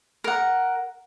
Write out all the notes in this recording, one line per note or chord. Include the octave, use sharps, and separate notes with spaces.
A#4 F#5